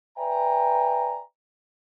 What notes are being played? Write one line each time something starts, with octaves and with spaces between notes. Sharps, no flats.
B4 D5 E5 G5 G#5 A#5